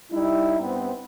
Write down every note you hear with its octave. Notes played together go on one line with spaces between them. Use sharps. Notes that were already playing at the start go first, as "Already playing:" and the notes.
G3 D#4 E4
G2 B3 C4